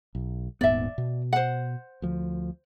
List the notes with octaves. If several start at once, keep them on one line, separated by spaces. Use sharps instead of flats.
B1
D#1 G#2 B3 D5 E5
B2
C5 F#5
D2 F3